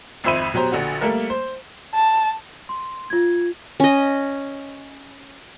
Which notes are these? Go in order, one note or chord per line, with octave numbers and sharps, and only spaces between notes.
G#1 F2 C5 E5 B5 D#7
B2 F#3 G4 C5 A#5
A#1 D3 F#4
G3 A3 A#3 A#4
C5
A5
C6
F4 G#6
C#4 D#5